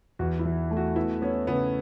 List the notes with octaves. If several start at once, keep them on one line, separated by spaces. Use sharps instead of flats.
E2 F#4
E4
E3
A3
F#4
B3 E4
B3 C#4
C#3 B3